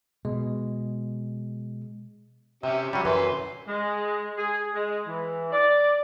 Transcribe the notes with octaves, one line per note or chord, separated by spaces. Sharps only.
B2 G#3
C3 C#4 G4 E5
F#3 G3 C#4
F#2 E3 B4 C6
G#3
G#4
G#3
E3
D5